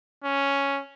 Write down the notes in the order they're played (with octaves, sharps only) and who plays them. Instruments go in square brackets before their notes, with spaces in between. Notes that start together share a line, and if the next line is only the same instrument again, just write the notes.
[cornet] C#4